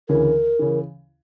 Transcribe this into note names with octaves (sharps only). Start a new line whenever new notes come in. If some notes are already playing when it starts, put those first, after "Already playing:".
D2 C#3 E3 A#4
C#3 E3